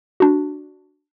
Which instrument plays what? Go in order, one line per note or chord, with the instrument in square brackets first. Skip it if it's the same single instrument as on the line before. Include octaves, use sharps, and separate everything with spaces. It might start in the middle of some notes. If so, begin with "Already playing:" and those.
[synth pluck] D4 F#4